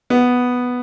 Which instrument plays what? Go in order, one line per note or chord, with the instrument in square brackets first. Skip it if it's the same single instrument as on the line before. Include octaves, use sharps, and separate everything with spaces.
[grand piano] B3